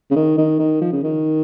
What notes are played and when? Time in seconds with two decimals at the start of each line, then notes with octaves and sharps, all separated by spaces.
0.11 C#3
0.16 D#3
0.38 D#3
0.59 D#3
0.81 F3
0.93 C#3
1.03 D#3